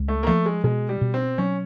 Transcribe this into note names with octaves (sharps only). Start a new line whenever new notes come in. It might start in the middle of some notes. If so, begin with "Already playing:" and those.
Already playing: C#2
A3
A#3
F3 A3
G#3
B2 G#3
G3
B2
C4
F#3 C#4